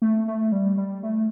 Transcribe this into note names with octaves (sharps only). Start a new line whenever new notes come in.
A3
A3
G3
G3
A3